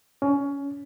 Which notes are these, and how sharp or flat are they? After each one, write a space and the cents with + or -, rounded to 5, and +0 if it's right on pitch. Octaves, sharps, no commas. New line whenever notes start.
C#4 +20